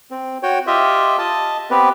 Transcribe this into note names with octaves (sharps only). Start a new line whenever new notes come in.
C4
F#4 C#5 G5
F4 G4 D#5 E5
D#5 A5
B3 C4 G4 B4